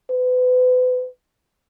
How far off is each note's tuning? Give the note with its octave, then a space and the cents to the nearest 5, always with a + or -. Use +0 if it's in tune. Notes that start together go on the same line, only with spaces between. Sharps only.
B4 +35